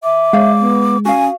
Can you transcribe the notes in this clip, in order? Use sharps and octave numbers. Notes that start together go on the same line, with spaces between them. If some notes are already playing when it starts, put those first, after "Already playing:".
E5 D6
G#3 C#5 D5 F5
B3
C#4 F#4 F5 G#5